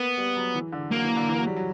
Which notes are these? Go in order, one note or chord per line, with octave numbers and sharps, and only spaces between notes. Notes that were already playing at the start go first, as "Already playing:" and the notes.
Already playing: A#3 B3
G3
F#3
E3
D3
F#3 A#3
E3
D3
E3
F#3
G3
F#3